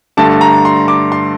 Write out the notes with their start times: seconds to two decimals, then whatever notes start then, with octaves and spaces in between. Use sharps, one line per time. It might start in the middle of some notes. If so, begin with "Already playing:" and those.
0.17 G2 D3 A3 A5
0.41 A#5
0.65 C6
0.88 D6
1.12 C6